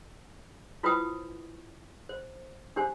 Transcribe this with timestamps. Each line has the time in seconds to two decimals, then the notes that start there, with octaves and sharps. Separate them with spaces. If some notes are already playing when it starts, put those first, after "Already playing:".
0.83 E4 F4 B4 C5 G5 D#6
2.09 C5
2.76 D4 G4 C5 G#5